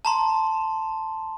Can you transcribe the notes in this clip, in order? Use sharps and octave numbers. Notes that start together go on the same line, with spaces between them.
A5 A#5 C6